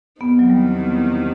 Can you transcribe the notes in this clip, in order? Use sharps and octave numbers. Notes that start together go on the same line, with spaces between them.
E2 C3 D#3 B3
F#3
G3